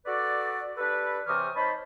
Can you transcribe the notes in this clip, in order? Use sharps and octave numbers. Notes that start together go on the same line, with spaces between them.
F#4 A4 B4 D5
D4 G4 A4 B4
C3 E3 G4 C#5 D#6 F6
D#4 C5 C#5 A5 B5